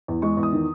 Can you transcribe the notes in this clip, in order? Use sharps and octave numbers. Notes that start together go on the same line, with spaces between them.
E2
G#3 C#6
E2
D#6
D#3